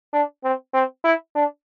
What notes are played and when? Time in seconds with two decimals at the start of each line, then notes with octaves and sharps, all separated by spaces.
0.13 D4
0.44 C4
0.74 C4
1.04 E4
1.35 D4